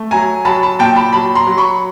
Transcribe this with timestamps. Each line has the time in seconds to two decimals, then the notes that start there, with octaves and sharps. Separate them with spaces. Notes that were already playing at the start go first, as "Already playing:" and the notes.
Already playing: A3
0.11 F#3 G#5 A#5
0.45 F#3 A5 B5
0.63 A5 B5
0.79 A#2 G5 A5
0.96 A5 B5
1.12 F#3 A5 B5
1.35 A#5 C6
1.47 F#3
1.58 B5 C#6